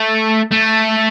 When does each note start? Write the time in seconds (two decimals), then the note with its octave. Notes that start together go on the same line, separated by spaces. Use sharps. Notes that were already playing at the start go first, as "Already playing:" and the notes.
Already playing: A3
0.52 A3